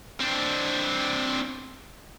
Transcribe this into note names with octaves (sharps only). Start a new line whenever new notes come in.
C4 D4